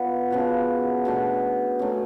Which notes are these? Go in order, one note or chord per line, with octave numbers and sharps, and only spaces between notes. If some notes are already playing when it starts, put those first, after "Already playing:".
Already playing: B3 F4 B4 D5
C#3 F3 B3 F#4
B2 A3 D4
F#3 A3 C#4 G#4